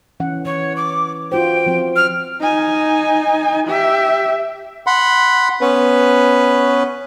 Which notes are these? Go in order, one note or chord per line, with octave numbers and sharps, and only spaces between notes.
E3 C#4 F#5
E3 C#5
D6
F4 F#4 C5 G5
F3 C4
F6
D#4 G#5
G4 E5
F#5 B5 C6
B3 C#4 B4